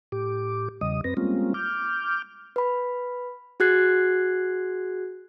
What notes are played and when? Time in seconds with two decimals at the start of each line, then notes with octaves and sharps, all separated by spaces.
0.12 A2 G4 D6
0.81 E2 C#3 G3 D#5 D#6
1.04 F#2 C4 B4 A#6
1.17 G3 G#3 A#3 C4 C#4 F4
1.54 D6 F6 G6
2.56 B4 B5
3.60 F#4 G#4 F#6 G#6 C7